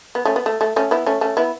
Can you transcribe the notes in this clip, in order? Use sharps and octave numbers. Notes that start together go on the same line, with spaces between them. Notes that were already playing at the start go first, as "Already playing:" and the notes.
B3
A3 C#4
B3
A3
A3
A3 C#4
B3 E4
A3 C#4
A3 C#4
B3 E4